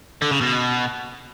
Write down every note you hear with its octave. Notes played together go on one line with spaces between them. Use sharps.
D3
C#3
B2